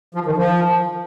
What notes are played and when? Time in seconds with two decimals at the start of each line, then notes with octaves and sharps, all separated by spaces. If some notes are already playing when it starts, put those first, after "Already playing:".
0.15 F3
0.26 D#3
0.37 F3